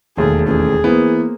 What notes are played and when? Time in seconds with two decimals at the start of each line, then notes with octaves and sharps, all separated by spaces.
0.17 E1 D#2 A3 G#4
0.47 A1 G#4
0.84 E3 A#3 B3 C5